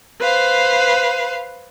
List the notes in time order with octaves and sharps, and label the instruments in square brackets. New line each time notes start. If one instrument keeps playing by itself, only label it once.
[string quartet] B4 C5 F5